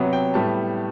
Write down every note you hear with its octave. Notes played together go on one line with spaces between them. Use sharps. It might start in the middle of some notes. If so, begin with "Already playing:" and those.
Already playing: C3 F#3 B3 F#5
G5
A2 G3 B3 A5